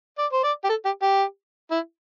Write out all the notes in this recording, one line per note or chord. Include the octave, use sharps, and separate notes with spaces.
D5
C5
D5
G4
A4
G4
G4
E4